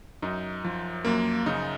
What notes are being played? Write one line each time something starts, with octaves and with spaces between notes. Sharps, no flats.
F#2 D#4
F3
F#2 A#3
C#3 D#4